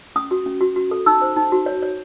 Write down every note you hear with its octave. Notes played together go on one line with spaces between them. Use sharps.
C#4 D#6
F#4
C#4
F#4
F#4
A4
D#4 E6
C5
D#4
F#4
C#5
C#5